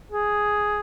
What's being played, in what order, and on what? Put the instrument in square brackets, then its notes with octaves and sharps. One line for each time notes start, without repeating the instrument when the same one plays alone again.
[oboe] G#4